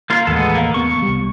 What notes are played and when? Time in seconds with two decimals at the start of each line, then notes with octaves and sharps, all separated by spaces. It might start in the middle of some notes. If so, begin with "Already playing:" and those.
0.10 A#3 F4
0.27 A1 D#2 G#3 B3 A4
0.55 A#3
0.74 E1 B3 C#6
1.02 C2 G3